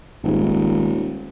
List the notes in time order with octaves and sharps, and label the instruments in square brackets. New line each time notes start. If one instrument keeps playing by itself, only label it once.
[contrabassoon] D#1 [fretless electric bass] G#1 G#2